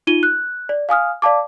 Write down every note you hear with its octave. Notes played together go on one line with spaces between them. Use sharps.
D#4 F4 D#7 G7
F#6
D5
F5 G#5 D#6 F6
D5 F5 A5 D6